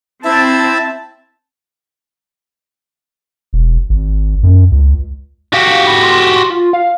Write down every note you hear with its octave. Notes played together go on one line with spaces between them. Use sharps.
C4 E4 E5 A5
E1
G#1
F#2
C#2
F#4 G4 F5
B5
C6
F4
F5